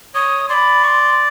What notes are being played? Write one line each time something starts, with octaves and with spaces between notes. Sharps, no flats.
C#5 D#6
D5 B5 C6
C#6
C6